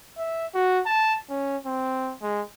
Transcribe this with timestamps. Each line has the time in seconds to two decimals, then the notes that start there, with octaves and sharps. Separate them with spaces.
0.18 E5
0.54 F#4
0.86 A5
1.30 C#4
1.66 C4
2.22 G#3